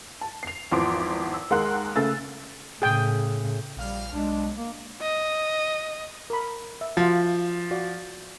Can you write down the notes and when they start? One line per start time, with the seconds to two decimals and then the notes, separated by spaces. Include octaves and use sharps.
0.21 A5
0.43 C7 F7
0.71 G#1 E2 F3 C6 D6 D7
1.34 E6
1.50 D#2 G#3 A#4 F#5 C6 F#6
1.96 C#3 A3 G#5 E6 A6
2.82 A2 C#3 G#4 G5
3.77 A#1 G3 F5 F6
4.13 B1 G#3 D4
4.57 A#3
5.02 D#5
6.30 A#4 B5
6.81 E5
6.97 F3 F4 F#4
7.71 F#4 D5 F5